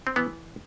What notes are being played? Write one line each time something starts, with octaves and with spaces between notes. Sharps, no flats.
C4
E3 B3